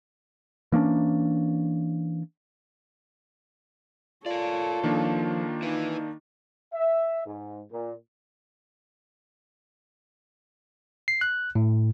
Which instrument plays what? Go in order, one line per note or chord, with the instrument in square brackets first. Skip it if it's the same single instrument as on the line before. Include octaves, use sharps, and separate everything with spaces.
[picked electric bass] E3 A#3 C#4 D4
[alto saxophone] F4 [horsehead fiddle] A4 C#5 [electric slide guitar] A#4 D5
[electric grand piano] D#3 A#3 D4 [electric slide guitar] F3
[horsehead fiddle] D#4 [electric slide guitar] E4 B4
[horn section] E5
G#2
A#2
[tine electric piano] C7
F#6
A2